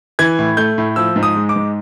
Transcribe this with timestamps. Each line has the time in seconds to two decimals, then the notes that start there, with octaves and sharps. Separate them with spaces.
0.19 E3 G#6
0.39 A2
0.57 A3 G6
0.78 A2
0.96 F3 E6
1.16 G#2
1.23 D#6
1.36 G#3
1.49 D6
1.56 G#2